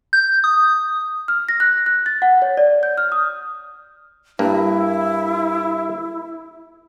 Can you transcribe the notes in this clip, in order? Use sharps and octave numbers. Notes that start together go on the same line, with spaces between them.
G6
D#6
F6
A#6
F#6
F#6
A6
F#5
C#5
D5
G6
F6
D#6
G2 A#3 E4